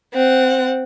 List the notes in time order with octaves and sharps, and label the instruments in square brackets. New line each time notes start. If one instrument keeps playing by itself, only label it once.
[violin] C4 F#5